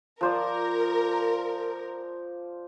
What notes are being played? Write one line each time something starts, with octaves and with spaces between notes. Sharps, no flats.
F3 A#4 C5 D5